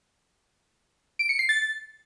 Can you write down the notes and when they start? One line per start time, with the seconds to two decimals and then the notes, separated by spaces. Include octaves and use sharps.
1.19 D7
1.29 C#7
1.39 C7
1.49 A6